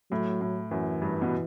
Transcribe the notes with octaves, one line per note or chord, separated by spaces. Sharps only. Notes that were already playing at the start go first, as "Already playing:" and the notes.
A2 F#3
A2
F#2 E3
G2
B2